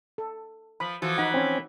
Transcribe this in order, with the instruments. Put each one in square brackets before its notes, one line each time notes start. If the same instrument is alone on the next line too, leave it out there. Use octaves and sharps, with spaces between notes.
[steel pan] A4
[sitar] F3 [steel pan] B5
[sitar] E3 F3 [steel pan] F#4 [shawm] A4
[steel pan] D#4 F#5 [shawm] B5
[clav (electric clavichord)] C4 C#4